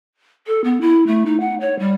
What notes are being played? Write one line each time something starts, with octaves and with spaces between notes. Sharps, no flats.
A4
B3
E4
A3
D#4
F#5
C#5
G3